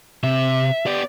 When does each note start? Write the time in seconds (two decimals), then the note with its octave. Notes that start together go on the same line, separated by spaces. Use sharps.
0.23 C3 E5
0.86 B3 G4 D5